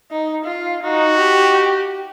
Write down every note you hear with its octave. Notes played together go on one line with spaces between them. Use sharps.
D#4
F4
D#4 F#4
G4